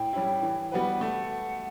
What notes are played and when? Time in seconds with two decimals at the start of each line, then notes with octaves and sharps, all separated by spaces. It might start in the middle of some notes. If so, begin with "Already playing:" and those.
Already playing: A2 G5
0.13 G3 C#4 E4
0.43 E3
0.72 G3 B3 F#4 B4
1.01 A3 F#5